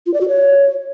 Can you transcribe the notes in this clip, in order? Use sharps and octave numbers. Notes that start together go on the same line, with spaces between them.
F4
D5
F#4
C#5